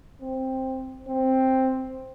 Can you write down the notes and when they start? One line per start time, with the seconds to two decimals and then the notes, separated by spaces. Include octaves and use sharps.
0.22 C4
1.08 C4